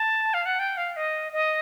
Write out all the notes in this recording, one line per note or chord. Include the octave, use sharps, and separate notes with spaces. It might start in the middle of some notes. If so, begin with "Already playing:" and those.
Already playing: A5
F5
F#5
G5
F5
D#5
D#5